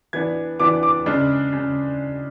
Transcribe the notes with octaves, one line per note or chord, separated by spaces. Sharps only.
E3 B3 D4 G#6
E3 B3 D4 D6
D6
C#3 G#3 D4
C#3